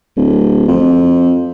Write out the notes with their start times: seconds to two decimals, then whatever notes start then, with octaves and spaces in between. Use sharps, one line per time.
0.17 D1
0.68 F2